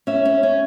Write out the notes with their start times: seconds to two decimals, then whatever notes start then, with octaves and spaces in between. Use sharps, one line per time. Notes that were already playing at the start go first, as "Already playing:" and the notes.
0.07 C#4 E5
0.25 C#4
0.43 C#4